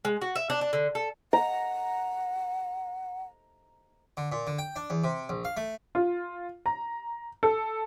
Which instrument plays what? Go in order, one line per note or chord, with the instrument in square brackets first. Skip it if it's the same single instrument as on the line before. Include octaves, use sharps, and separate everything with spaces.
[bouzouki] G#3
F#4
E5
D4
D4
D3
A4
[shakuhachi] F#5 [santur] A#5
[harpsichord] D3
A#2
D3
G5
D4
E2
C3
A#1
F5
A3
[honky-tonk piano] F4
A#5
A4